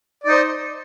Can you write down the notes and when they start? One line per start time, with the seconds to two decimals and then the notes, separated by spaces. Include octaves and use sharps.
0.24 D5
0.27 D#4
0.31 C5